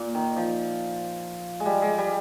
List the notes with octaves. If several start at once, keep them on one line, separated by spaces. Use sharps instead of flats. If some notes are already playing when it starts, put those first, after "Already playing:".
Already playing: A#2
D#3
F3
G#3
G3
G#3
G3